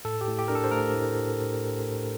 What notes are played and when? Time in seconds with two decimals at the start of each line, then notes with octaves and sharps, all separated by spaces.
0.05 A2 A4
0.21 G4
0.27 A2
0.39 G4
0.48 D4 A#4
0.55 A4
0.64 C5
0.71 A3 A#4
0.94 A2